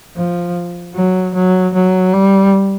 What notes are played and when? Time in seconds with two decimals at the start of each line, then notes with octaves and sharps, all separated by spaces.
0.16 F3
0.95 F#3
1.34 F#3
1.74 F#3
2.13 G3